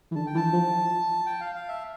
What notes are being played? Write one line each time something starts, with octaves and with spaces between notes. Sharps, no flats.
E3
D3 A5
G5
E3 A5
F3
G5
F5
F5
E5